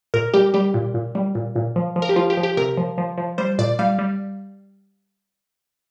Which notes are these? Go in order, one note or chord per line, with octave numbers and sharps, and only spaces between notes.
A#2 A#4
G3 G4
G3 G4
A#2
A#2
G3
A#2
A#2
F3
F3
A#4
G4
F3 F4
G4
F3
G4
C3 A#4
F3
F3
F3
G3 C5
A#2 D5
G3 F5
G3